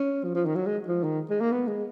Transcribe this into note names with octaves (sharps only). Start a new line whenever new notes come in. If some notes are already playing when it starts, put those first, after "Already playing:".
Already playing: C#4
F3
F3
D#3
F#3
G#3
F3
D#3
G#3
A#3
B3
G#3